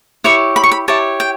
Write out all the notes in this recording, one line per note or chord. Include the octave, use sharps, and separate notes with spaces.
E4 G4 C#5 C#6
B5
C#6
B5
E4 G4 C#5 A5
G5